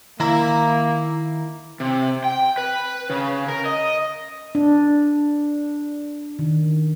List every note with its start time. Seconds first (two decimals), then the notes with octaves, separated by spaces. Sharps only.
0.20 D#3 A#3 E4 A#5
1.80 C3
2.24 G5
2.58 B4
3.10 C#3
3.48 A#4
3.65 D#5
4.55 D4
6.39 D#3